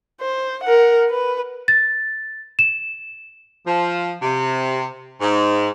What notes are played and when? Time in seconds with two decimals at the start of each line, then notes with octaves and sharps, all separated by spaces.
0.21 C5
0.64 A#4 F#5
1.09 B4
1.68 A6
2.59 E7
3.67 F3
4.22 C3
5.20 G#2